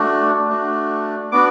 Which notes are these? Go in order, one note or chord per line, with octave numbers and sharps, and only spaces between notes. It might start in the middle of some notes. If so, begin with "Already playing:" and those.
Already playing: A3 D4 F#4
A3 D4 F#4
B3 D4 F#4 D6